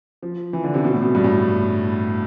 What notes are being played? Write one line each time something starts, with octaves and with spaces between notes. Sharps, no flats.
F3
E3
D3
C3
B2
A2
B2
G2
A2